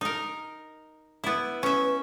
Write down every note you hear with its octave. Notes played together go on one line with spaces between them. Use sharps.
D#4 A#4
B3 E4
C#4 B4 E5